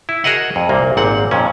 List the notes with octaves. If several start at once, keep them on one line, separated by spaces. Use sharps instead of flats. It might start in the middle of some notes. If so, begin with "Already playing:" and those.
E4
F#4 G#4 A#4 D#5 F#5
F2
C2 A#2 A#3
G#1 A#2 C4 F#5
F2 A#2 C#4